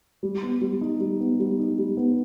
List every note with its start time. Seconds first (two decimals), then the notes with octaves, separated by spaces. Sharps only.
0.23 G3
0.43 B3
0.61 G3
0.81 D#4
1.00 G3
1.20 B3
1.40 G3
1.59 D#4
1.79 G3
1.97 B3